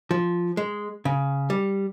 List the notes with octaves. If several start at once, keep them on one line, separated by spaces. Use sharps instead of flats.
F3
G#3
C#3
G3